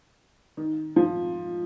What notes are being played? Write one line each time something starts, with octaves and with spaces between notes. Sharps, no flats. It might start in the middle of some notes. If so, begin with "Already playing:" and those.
D#3
F3